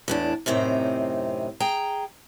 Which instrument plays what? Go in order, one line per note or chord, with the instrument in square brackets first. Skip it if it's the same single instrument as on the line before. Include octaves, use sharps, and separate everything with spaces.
[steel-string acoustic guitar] E2 A2 D4
F#2 A2 C3 C4 D#4
G#4 G5 A#5